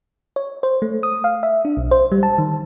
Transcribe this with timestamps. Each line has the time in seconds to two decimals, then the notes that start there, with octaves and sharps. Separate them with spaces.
0.36 C#5
0.63 C5
0.82 A3
1.03 D#6
1.24 F5
1.43 E5
1.65 D4
1.77 B1
1.91 C5
2.12 G3
2.23 A5
2.38 D#3